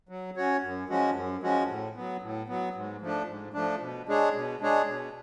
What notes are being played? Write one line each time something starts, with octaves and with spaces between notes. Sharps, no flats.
F#3
C#4 F#4 C#5
F#2
F3 G#3 C#4 F#4
F#2
F3 G#3 C#4 F#4
A2
F#3 B3
A2
F#3 B3
G#2
F3 A3 D4
G#2
F3 A3 D4
B2
G#3 D4 G#4 C#5
B2
G#3 D4 G#4 C#5
B2